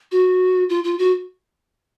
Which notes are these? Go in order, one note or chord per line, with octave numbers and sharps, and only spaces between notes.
F#4
F4
F4
F#4